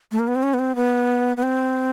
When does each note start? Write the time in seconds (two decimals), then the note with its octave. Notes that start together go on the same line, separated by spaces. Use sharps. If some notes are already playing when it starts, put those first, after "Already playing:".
0.12 A3
0.19 A#3
0.28 B3
0.35 C4
0.43 C#4
0.54 B3
0.59 C4
0.76 B3
1.37 B3
1.43 C4